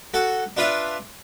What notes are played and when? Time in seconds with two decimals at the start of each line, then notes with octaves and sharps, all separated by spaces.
0.14 F#4 A4 F#5
0.57 D4 F4 B4 D5 E5